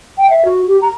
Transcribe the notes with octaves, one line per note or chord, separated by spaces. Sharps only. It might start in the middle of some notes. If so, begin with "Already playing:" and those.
G5
E5
F#4
G4
A#5